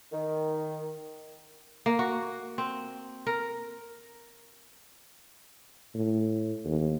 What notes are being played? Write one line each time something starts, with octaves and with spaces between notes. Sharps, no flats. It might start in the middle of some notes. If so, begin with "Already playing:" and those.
D#3
A#3
F#4
C4
A#4
A2
D#2